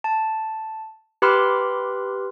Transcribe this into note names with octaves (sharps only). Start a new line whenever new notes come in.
A5
G4 B4 B5 C6 D6 F6